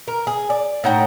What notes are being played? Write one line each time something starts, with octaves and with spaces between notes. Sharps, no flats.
A#4
G#4
D5
A2 D#4 F#5 G5